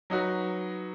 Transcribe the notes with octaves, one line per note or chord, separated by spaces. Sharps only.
F#3 D#4 F#4 B4